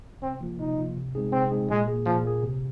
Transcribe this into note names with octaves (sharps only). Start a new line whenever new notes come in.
C3 C4
F3 A#3 F4
C3 D#4
F3 A#3 F4
C3
G#3 C4 D#4 G#4
C3 C4
G#3 C4 D#4 G#4
A#2 G#3
A#3 G#4
A#2 F3
A#3 G#4
C3